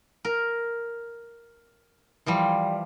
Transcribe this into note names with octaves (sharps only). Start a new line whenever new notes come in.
A#4
E3 F3 G3